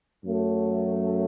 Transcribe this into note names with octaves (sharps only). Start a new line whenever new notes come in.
F#2 F#3 A3